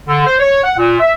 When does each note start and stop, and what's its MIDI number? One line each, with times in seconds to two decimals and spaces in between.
0.07 0.24 50
0.26 0.34 72
0.40 0.62 73
0.64 0.74 78
0.78 0.98 46
1.00 1.13 76